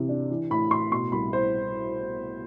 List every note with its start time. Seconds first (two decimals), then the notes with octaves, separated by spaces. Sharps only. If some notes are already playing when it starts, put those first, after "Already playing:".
Already playing: C3 E3 E4
0.09 D4
0.30 E3
0.50 A2 B5
0.71 A2 C6
0.91 B2 C6
1.12 C2 B5
1.32 E4 C5